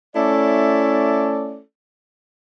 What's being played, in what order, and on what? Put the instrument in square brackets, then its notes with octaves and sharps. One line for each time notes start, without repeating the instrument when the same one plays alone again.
[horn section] A3 C#4 E4 A4 D5